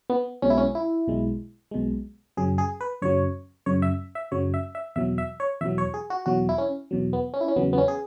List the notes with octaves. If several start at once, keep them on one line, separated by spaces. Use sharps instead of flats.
B3
B1 B2 G#3 C#4
E4
C#4
E4
B1 B2 G#3
B1 B2 G#3
F#2 C#3 F#3 G#4
G#4
B4
F#2 C#3 F#3 C#5
F#2 C#3 F#3 C#5
E5
E5
F#2 C#3 F#3 C#5
E5
E5
E2 B2 F#3 E5
E5
C#5
E2 B2 F#3 E5
C#5
G#4
F#4
E2 B2 F#3 F#4
E4
C#4
E2 B2 F#3
B3
C#4
E4
C#4
E2 C#3 F#3 B3
B3
C#4
G#4